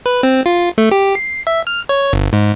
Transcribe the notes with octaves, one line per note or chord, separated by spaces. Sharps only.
B4
C4
F4
A3
G4
C7
E5
F6
C#5
G1
G#2